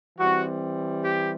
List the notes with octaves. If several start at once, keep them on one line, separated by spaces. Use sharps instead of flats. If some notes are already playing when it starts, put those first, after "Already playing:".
E3 G3 C4 F#4
G4